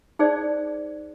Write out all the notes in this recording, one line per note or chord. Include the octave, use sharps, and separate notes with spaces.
D#4 G#4 C5 D5